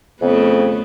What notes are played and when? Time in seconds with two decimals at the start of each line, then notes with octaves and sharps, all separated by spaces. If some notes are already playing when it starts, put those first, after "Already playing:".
0.21 F2 C#3 A3 B3